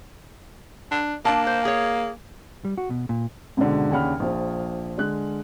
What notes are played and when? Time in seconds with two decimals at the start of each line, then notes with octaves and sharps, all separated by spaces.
0.91 D4
1.25 A#3 D4 A5
1.47 C5
1.65 G#4 C#5
2.65 G3
2.78 F#4
2.90 B2
3.09 A#2
3.57 C#2 G#2 B2 D3
3.91 D#2 C#3 D4 F#5 B5 F6
4.20 A#1 F3
4.98 D3 G#3 F#6